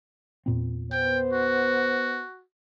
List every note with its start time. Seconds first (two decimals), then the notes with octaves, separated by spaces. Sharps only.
0.46 E2 A#2 C4
0.92 B3 C5 G5
1.33 F#4